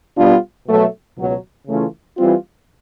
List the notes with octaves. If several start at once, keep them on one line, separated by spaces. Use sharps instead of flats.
B2 G3 B3 D4 F4
B2 F#3 A3
C#2 B2 F#3
C#3 E3 A3 C#4 F4
E3 G3 C4 F4